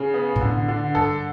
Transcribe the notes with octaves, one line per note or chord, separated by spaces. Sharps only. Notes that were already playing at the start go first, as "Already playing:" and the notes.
Already playing: C#3
B3
B2
A2 D3
D3
G2 A4